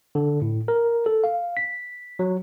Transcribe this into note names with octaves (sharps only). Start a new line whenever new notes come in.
D3
A2
A#4
A4
F5
B6
F#3